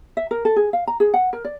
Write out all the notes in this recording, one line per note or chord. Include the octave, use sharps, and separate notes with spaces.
E5
A#4
A4
G#4
F5
A#5
G#4
F#5
A#4
D5